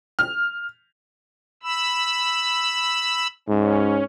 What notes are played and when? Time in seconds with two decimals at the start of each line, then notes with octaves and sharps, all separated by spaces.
0.19 F6
1.63 B5 E6
3.48 G#2 C#4